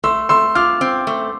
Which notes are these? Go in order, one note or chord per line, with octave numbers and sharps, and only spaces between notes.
A3 C6 E6
A3 C6 E6
F4 D6 F6
C4
A3